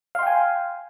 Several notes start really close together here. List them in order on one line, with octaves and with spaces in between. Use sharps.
F5 C6 G5 G#5